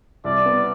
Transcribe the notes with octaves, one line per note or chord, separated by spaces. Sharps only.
C2 D5
B3